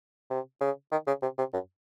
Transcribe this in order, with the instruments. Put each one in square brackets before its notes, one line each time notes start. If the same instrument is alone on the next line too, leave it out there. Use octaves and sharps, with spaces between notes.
[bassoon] C3
C#3
D#3
C#3
C3
C3
F#2